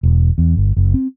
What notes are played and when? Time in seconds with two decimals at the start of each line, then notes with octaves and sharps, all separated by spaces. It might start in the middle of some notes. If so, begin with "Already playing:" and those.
0.03 E1
0.38 E2
0.57 G1
0.77 F#1
0.94 C4